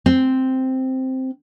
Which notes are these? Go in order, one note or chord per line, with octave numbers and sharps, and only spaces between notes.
C4